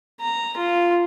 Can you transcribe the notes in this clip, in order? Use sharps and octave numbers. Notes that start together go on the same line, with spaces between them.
A#5
F4